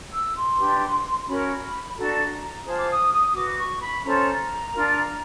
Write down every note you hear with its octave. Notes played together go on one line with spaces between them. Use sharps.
E6
C6
D4 G4 B4
C6
C#4 F#4 A#4 C#5 B5
D4 F#4 A4 A#5
F4 G#4 C5 A5
D6
D#6
D#6
F#4 B4 D6
C#6
B5
C#4 F4 A4 C5 A#5
D4 F4 A#4